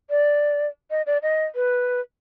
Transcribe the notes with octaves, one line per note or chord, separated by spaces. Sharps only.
D5
D#5
D5
D#5
B4